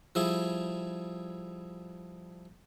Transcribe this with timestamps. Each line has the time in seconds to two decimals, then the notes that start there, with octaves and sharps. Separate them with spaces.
0.15 F3 G3 E4 G#4